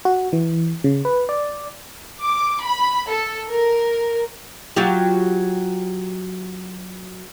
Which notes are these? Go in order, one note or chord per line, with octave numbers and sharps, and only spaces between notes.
F#4
E3
C#3
B4
D5
D6
B5
A4
A#4
F#3 F4 G4